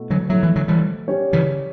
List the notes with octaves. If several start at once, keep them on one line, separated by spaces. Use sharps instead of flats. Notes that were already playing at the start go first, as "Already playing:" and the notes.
Already playing: B2 A3 E4
D3 F#3
B2 F#3 A3 E4
E3
D3 F#3
E3 G3
G3 C#4 G4 C#5
C#3 E3